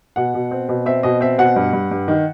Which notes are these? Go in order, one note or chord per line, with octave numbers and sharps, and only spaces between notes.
B2 F#5
B2
C4
B2
C4 E5
B2 D#5
C4 E5
B2 F#5
G2
G2
G2
D#3